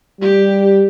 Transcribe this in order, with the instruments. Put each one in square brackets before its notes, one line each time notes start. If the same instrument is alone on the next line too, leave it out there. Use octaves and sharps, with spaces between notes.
[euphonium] G3 [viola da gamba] G4